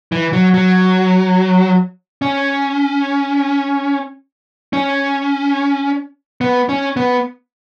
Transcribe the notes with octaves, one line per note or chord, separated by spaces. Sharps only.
E3
F#3
F#3
C#4
C#4
B3
C#4
B3